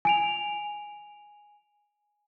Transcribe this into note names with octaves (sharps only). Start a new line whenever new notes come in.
G#5 D7 F7